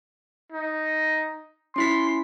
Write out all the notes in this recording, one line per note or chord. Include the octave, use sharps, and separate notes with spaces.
D#4
C#4 E4 C6 B6